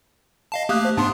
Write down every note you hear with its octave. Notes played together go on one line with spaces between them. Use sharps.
D#5 F5 A5
A3 A#3 G4 F5 D#6 F#6
C5
G#2 B3 D4 A5 C6